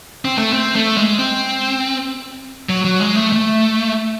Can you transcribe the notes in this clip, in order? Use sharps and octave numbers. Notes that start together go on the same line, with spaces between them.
C4
A3
C4
A3
G#3
C4
F#3
F#3
G#3
A3
A3